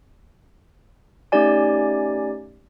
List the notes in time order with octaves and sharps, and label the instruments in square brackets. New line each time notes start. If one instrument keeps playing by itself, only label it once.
[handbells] A3 C#4 D#4 G4 D5 G#5